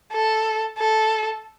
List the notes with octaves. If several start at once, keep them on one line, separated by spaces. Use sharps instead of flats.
A4
A4